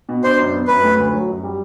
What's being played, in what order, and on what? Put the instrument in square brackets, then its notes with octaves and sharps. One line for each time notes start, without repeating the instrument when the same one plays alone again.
[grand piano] B2
[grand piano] D4 [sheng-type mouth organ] C5
[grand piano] F#2
B3
[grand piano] F#2 [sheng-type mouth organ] B4
[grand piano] A3
D2
F#3
F#2
G3